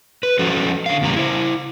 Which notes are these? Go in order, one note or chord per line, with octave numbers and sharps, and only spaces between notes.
B4
F3 C#4 F#4 A4 C5
D3 F5
E2 A#2 C#3 G3 A#3 A#5
E4 C5